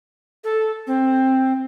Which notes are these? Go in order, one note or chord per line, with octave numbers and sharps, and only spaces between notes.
A4
C4